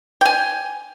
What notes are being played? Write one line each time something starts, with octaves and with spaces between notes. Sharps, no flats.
G5 G#5